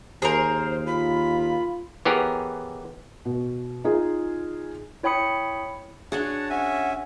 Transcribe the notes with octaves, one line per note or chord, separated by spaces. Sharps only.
D#2 G#4 A#4 C5
F4 B5
E3 B3 G4 G#4 A#4 C#5
B2
D#4 F4 G#4
E4 C#5 G5 B5 D#6 C#7
D4 F#4 G#4 C#5 F#5 A5
C#4 E5 F#5 G#5